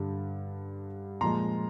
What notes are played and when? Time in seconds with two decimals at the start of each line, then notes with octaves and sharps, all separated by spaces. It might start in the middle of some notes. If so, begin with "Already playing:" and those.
Already playing: G2 D3 G3
1.21 A#2 F3 G#3 A#5 C6